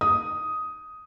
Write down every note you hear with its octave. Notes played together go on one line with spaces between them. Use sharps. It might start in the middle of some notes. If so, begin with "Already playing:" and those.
D#6